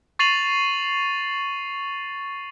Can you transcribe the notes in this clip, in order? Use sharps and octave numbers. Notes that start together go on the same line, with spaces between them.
C#6 A6 C7 D#7 F7 F#7